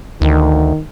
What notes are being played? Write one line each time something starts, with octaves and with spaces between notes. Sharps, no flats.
D2 D#3